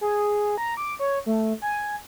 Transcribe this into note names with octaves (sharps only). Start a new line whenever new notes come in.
G#4
A#5
D6
C#5
A3
G#5